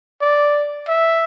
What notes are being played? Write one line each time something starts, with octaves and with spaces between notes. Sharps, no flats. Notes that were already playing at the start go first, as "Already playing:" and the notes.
D5
E5